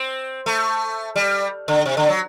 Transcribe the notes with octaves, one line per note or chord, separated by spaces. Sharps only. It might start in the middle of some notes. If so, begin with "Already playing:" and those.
Already playing: C4
A3
G3
D3
C3
D3
F#3